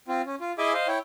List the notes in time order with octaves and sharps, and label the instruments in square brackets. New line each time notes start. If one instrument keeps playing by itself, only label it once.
[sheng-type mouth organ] C4 F4
C#4
F4
E4 G#4 D#5 E5 G#5 D6
C5 D#5 F5
E4 C#5 G5